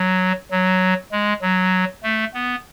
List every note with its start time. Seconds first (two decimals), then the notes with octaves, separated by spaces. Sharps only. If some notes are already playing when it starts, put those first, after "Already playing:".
Already playing: F#3
0.51 F#3
1.12 G#3
1.42 F#3
2.03 A3
2.34 B3